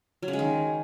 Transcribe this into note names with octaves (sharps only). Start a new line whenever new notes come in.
F#3
C#3
G#3
D#3